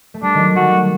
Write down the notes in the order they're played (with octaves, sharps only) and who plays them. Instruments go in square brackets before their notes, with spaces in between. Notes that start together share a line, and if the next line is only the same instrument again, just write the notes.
[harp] A3
[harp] G3 [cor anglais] D4
[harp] D#3 F#3
[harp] G3 [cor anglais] F#4
[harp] A3